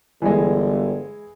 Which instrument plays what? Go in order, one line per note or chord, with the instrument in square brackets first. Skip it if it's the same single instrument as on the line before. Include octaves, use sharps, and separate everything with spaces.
[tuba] G1 [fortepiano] E3 G#3